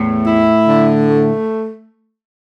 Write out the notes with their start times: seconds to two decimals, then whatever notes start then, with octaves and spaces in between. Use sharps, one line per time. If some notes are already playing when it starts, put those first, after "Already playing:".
Already playing: E2 A2
0.26 E4
0.67 D3
1.06 A3